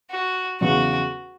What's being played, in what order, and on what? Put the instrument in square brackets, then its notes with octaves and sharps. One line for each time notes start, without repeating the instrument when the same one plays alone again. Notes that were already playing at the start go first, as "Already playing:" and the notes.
[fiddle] F#4
[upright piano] E2 C#3 F#3 [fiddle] F#4